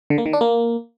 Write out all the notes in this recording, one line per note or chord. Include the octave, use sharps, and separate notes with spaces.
D3
A#3
D#3
D4
A#3